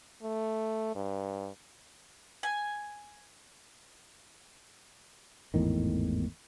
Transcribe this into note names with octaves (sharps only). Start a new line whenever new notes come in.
A3
G2
G#5
G#1 E2 A2 D#3